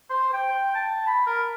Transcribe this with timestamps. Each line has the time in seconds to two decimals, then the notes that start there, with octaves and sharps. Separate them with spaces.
0.10 C5
0.33 G5
0.75 A5
1.07 B5
1.26 A#4